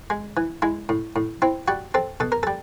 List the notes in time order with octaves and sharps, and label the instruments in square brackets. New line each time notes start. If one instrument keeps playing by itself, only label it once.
[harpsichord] G#3
E3
G#3 E4
A2
A2
C4 E4
G3 F#4
C4 A4
B2 A4
A#4
G3 A4